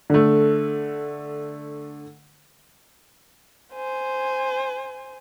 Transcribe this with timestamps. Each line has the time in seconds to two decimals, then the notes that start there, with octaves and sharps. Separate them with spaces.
0.10 D3 A3
3.74 C5 G#5